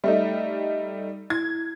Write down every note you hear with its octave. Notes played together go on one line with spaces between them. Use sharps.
G3 A3 D#4 E5
E4 G#6